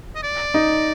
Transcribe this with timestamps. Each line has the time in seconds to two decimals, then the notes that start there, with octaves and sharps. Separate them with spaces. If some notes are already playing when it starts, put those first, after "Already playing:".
0.16 D#5
0.23 D5
0.54 D#4